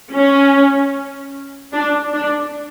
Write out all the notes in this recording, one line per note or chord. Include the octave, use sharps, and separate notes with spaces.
C#4
D4
D4